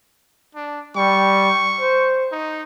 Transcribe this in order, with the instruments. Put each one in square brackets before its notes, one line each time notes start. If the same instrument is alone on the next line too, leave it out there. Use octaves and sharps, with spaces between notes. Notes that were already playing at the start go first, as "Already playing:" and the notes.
[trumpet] D4
[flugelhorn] G3 [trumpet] C#6
[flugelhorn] C5
[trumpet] D#4